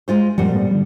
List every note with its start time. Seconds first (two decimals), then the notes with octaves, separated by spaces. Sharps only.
0.08 G#3 F4 C5
0.38 F#2 A#2 F3 G3 F#5
0.52 G#2 A3 B3
0.71 D3 G3